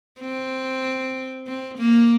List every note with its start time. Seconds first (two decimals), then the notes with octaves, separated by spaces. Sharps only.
0.20 C4
1.47 C4
1.78 A#3